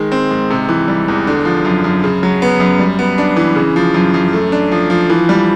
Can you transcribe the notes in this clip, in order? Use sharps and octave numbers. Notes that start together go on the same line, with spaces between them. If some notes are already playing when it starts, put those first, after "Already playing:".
Already playing: D#3 G#3
C4
G#2
C3
E3
G3
E2
D3
F3
F#2
F#2
C#3
F#3
B3
F#2
G3
B3
D4
E3
C#3
F3
F#2
F#2
A3
D4
F3
F3
E3
G3